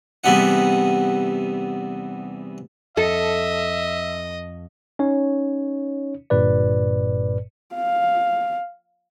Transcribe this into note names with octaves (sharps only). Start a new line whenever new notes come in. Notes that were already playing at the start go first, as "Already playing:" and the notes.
E2 C3 G3 B3 D#4 F#5
F2 A4 D#5 E5
C#4 D#4 C#5
G1 G2 A#2 B4 D5
F5